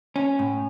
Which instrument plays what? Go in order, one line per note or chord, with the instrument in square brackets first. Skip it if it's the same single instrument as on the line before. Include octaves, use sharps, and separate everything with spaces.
[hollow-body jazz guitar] C#4
A2